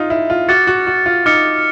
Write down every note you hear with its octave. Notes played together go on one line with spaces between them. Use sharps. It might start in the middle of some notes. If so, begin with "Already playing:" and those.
Already playing: D#4 F4
E4
F4
F#4 D6 F6 A6 C#7
F#4
F#4
F4
D#4 D6 F6 A6 C#7